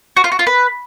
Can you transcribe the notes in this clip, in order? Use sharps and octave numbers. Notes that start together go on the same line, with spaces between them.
F#4
F4
F#4
F4
B4